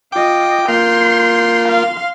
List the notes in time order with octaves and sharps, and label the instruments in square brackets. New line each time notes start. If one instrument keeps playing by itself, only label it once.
[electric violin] F4 D#5 [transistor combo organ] G5 D6
[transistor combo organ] A#3 F4 [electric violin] C6 G6
[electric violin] F5 C6